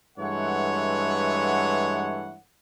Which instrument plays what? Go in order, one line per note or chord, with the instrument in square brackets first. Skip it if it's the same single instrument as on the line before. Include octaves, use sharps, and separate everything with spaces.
[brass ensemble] G2 E3 G#3 A3 C#5 F#5